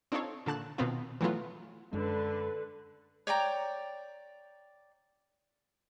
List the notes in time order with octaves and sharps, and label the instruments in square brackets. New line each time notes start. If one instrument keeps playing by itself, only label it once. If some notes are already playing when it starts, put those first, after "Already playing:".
[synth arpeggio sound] C4 D4 D#4 F4 A4 C#5
A#2 D3 A5 F#6 E7
B2 D#3 B3 C4 F4
E3 F#3 A3 B3 F4
[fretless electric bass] F#2 G#3 [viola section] D3 B4
[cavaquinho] C#5 D5 G5 A#5